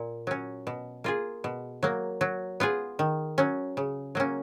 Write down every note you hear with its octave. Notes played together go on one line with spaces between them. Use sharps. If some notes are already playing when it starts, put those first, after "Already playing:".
Already playing: A#2
F#3 C#4
B2
A#3 F4 G#4
B2
F#3 A#3
F#3
B3 F4 G#4
D#3
F#3 C#4
C#3
F#3 A#3 C#4